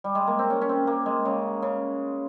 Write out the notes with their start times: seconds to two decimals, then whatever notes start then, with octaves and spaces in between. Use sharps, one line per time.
0.04 G3
0.15 G#3
0.27 A#3
0.39 C4
0.50 C#4
0.61 C#4
0.69 C4
0.87 A#3
1.06 G#3
1.25 C#3
1.62 C#3